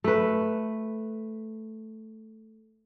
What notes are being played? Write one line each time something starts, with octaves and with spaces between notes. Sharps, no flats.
A3 B4